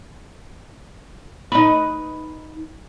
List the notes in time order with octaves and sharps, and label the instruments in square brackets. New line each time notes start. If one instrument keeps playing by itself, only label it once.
[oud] D#4 B4